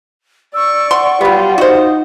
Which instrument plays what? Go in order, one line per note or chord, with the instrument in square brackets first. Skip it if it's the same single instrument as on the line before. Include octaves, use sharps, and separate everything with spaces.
[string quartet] D5 C#6 [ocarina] E6
[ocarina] F#5 [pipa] C6
[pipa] F#3 B3 [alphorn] G3 [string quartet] F4
[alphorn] D#4 [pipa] F#4 C5